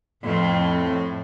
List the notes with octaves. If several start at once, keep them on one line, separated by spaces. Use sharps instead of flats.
F2 A2 C4